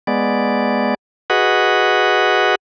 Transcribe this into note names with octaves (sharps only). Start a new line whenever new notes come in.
G#3 B3 D5
F#4 G#4 B4 D#5 F#5